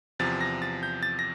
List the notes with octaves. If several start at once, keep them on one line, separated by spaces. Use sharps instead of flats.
E2 C3 F3 A6
A#6
A6
G6
A6
A#6